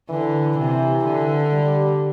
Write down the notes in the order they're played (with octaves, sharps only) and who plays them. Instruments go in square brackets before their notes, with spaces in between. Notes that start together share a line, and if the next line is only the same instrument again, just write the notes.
[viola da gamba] D3 [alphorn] E3
[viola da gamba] C3
D3
[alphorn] G3